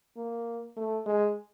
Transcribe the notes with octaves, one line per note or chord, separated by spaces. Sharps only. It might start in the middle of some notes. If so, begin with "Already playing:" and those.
A#3
A3
G#3